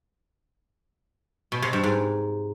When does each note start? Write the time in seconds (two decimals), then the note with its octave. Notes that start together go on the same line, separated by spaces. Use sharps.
1.52 B2
1.62 C3
1.73 G2
1.83 G#2